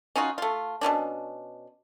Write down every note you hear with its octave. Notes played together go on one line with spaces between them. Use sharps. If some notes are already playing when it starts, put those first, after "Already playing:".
C#4 D#4 F4 F#4
A3 F4
B2 E3 C#4 D4